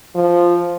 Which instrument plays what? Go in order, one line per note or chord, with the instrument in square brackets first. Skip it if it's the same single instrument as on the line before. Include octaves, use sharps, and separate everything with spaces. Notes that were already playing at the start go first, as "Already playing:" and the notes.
[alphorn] F3